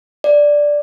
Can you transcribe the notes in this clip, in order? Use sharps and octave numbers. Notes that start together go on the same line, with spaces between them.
D5